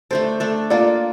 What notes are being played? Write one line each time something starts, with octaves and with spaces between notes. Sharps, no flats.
A3 D4 A4 C5
A3 D4 A4
A#3 F4 A4 D5 F5